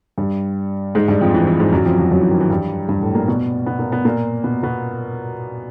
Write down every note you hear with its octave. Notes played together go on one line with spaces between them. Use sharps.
G2 G3
G#2 G#3
G2 G3
F2 F3
E3
E3
G#2 G#3
F#2 F#3
F2 F3
F#2 F#3
F#2 F#3
E3
D#3
E3
G2 G3
G2 G3
A2 A3
A#2 A#3
B2 B3
B2 B3
A#2 A#3
B2 B3
A#2 A#3
B2 B3
B2 B3